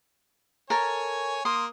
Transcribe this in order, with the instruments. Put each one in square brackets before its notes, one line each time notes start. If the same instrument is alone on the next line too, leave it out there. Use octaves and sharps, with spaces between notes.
[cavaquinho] A4 A#4 [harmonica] C#5 G#5
[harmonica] A#3 D#6 [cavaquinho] C6